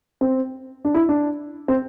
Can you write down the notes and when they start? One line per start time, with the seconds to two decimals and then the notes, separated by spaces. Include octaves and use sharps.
0.21 C4
0.85 D4
0.94 E4
1.09 D4
1.68 C4